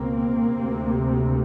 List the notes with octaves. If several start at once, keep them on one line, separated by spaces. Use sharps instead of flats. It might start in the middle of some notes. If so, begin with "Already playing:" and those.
Already playing: C#2 B2 A#3 C4
D2 C3